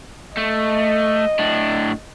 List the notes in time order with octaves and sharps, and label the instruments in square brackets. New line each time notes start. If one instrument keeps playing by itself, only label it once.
[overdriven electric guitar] A3 [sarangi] D#5
[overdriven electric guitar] A2 D4